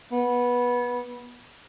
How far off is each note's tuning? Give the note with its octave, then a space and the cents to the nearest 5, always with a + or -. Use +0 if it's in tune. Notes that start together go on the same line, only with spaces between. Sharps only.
B3 -15